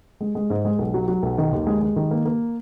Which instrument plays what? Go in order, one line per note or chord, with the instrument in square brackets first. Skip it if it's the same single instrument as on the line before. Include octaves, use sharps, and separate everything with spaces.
[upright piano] G#3
G#3
G#2
G#3
B1
F#3
F#3
B1
D#3
D#2
G#3
G#3
D#3
A#3
A#3